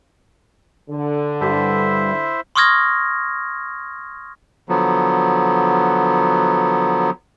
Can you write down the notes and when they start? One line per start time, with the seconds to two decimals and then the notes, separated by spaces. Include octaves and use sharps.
0.90 D3
1.41 G2 E4 C5 E5
2.56 C6 C#6 D#6 F6 G#6 A#6
4.69 D3 F3 F#3 B3